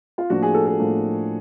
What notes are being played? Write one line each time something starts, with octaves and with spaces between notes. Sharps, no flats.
F4
A2 F3 A#3 D4 F#4
G#4
A4
A4
A2 F3 A#3 D4